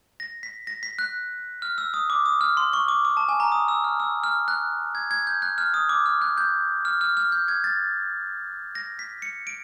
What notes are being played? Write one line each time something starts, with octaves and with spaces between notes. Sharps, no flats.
A#6
B6
A#6
B6
F#6
F6
E6
D#6
D6
D#6
F6
C6
C#6
D6
D6
A5
G#5
A#5
D#6
E6
F6
E6
F6
F#6
G#6
G#6
G6
F#6
F6
D#6
D6
F6
F#6
G6
F6
F6
F6
G6
G#6
A6
A#6
B6
C#7
D7